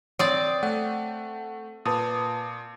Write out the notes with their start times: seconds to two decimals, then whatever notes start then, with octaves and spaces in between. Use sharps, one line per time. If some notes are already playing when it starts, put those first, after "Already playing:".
0.19 C4 C#5 D5 D#6
0.63 A3 F#5
1.85 A#2 B4 A5 D#6